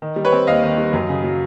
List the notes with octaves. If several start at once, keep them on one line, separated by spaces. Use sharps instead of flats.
D#3
G3
B4 C#5
C4
D#2 D#5 F5
D#3
G3
F#2
C#3
F#3